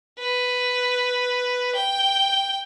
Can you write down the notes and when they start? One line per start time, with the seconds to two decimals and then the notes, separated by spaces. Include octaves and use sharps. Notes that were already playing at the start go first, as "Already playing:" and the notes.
0.19 B4
1.75 G5